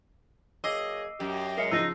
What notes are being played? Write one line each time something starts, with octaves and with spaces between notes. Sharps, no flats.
F#3 A#3 G#4 D#5 D6 E6 C7
F#2 G4
C#3 G#3 A#4 D#5 E5 C7 C#7
C#3 F3 D#4 E6 A#6 C7